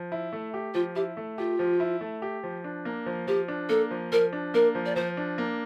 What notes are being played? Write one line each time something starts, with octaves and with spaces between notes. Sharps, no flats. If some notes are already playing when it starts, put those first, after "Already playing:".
Already playing: F3
E4
A3
G4
F3 F4
E4 G4
A3
F4 G4
F3
E4
A3
G4
F3
D4
A#3
F3
F3 G4
D4
A#3 A4
F3
F3 A#4
D4
A#3 A#4
F3
D5
F3 C5
D4
A#3